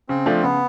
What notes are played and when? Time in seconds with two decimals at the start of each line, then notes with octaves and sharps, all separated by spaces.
0.09 C#3 C4
0.26 F3 A3 D4
0.43 C#3 B3